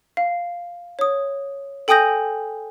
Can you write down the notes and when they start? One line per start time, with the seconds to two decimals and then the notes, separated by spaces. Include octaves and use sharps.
0.17 F5
0.99 C#5 D#6
1.88 A4 G5 G#5 D#6 G6 A#6